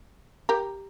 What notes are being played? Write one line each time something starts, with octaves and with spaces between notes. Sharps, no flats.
G4 A#4